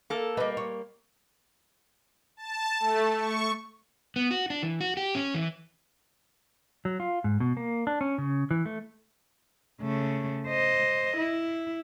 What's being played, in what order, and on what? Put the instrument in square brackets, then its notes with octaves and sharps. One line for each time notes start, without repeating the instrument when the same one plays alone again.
[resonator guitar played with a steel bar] A#3 A4
[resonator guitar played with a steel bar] G3 A#3 [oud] B4 D#5
[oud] C#5
[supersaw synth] A5
A3
C#6
[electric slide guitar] B3
F#4
D4
E3
F#4
G4
C#4
E3
F#3
F4
G#2
B2
A#3
D4
C#4
C#3
E3
A3
[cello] C#3 A3
C5 D#5
E4